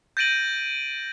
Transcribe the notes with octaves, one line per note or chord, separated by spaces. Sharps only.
G6 A6 A#6 D7 D#7 F#7